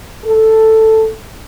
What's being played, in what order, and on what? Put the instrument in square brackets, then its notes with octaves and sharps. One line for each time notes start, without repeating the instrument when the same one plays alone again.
[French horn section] A4